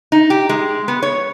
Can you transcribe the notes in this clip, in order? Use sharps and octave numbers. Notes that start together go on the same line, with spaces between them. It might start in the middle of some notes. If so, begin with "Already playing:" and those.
D#4
G4
G#3
B3
C#5